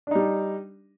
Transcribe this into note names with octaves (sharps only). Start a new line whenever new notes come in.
G3 D4 D#4